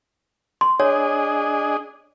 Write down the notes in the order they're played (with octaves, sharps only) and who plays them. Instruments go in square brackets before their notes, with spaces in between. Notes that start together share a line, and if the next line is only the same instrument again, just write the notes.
[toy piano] C6
[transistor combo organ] D4 G#4 D#5 [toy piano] C#5